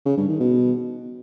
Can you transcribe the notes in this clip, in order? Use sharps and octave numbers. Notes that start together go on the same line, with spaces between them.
C#3
G2
D#3
B2